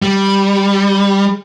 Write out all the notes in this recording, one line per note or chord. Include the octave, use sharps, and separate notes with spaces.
G3